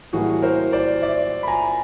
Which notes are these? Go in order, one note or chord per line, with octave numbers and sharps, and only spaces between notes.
A2 E3 G3 A#3 F#4 G#4
A#4 C5
C5 D5
D5 E5
B5
G#5 A#5